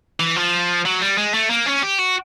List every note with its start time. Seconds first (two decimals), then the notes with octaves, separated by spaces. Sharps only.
0.20 E3
0.36 F3
0.85 F#3
1.01 G3
1.18 G#3
1.34 A3
1.50 A#3
1.66 C#4
1.83 G4
1.99 F#4